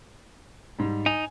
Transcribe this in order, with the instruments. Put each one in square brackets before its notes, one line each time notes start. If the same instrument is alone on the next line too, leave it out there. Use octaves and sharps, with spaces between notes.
[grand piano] G#2 G3
[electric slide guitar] D#4 [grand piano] G#5